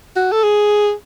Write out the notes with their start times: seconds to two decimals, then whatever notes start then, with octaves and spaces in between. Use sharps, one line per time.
0.16 F#4
0.32 A4
0.43 G#4